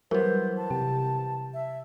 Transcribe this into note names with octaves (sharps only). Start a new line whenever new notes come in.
E3 F#3 G3 B3 A#4 C5
A5
C3 G4
E5